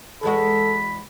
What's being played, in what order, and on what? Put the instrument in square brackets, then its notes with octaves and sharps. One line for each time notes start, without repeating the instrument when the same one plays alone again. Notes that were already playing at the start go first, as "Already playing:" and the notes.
[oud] E2 G#3 F#4 [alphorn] A4 [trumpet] B5